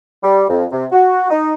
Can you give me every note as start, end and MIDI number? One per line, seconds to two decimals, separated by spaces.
0.23 0.44 55
0.49 0.65 41
0.72 0.86 48
0.92 1.27 66
1.30 1.54 63